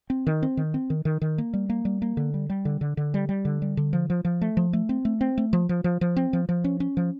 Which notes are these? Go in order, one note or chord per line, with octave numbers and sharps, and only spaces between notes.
C4
D#3
C4
D#3
C4
D#3
D#3
D#3
A#3
G3
A#3
G3
A#3
D3
G3
G3
D3
D3
D3
G3
G3
D3
G3
D3
F3
F3
F3
A3
F3
A3
C4
A3
C4
A3
F3
F3
F3
F3
C4
F3
F3
C#4
C#4
F3